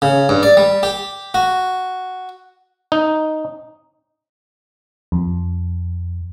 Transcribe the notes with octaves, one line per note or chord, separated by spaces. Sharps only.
C#3
G2
D5
G3
G4
F#4
D#4
F2